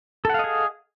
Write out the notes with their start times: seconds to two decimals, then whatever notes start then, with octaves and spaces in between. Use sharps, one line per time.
0.25 A4
0.30 F#5
0.34 F5
0.39 D#5
0.44 G#4